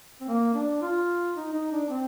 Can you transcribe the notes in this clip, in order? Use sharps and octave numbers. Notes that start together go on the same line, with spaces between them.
C4
A#3
D4
F4
D#4
D#4
D4
C4